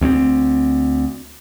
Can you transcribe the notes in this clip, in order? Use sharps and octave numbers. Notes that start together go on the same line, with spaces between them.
D2 G#3 C4